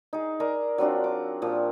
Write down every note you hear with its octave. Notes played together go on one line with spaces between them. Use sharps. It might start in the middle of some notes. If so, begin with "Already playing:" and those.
D#4 G#4
A#4 D5 G#5 A#5
F#3 C4 D4 F4
D6
A#2 F3 G4